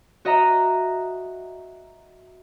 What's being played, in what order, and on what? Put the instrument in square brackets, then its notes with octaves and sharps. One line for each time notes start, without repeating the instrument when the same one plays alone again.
[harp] F#4 D#5 E5 A#5